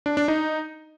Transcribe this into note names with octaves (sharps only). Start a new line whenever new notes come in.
D4
D4
D#4